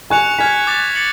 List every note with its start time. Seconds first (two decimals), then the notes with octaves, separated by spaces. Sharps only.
0.10 G#5 C#6 F#6 C#7 F7
0.38 G#5 F6 G#6 B6
0.67 D6 F#6 A6
0.95 A6 C#7 F#7